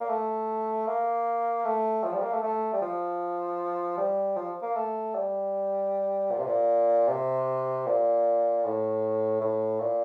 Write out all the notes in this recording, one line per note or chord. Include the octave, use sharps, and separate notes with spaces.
A#3
A3
A#3
A3
F3
G3
A#3
A3
A3
G3
F3
G3
F3
A#3
A3
G3
A#2
C3
A#2
C3
A#2
A2
A2
A#2